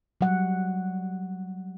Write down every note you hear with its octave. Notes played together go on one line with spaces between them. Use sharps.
F#3 G3 F#5